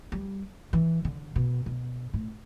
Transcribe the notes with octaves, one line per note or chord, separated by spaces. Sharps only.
G3
E3
D3
B2
B2
A2